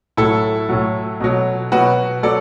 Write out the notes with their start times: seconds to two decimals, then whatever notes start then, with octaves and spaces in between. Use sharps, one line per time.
0.17 A2 F#3 E4 A4
0.69 A2 F#3
1.20 B2 F#3
1.72 B2 F#3 F#4 B4
2.23 F#3 A4 D5